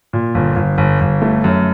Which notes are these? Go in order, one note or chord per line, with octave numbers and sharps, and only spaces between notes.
A#2
G1
G1
G1
G1
A3
F#2